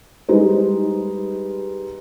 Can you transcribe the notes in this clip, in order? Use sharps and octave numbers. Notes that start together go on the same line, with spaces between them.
G3 G#3 D#4 B4 C5